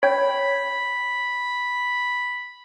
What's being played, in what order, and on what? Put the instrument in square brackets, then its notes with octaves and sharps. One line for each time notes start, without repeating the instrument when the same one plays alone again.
[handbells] C#5 G5 G6 [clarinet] B5